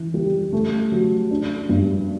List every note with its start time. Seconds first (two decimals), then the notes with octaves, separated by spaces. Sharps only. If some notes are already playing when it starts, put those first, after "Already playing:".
Already playing: E3
0.14 G3
0.53 A3
0.92 F#3
1.31 D4
1.69 G2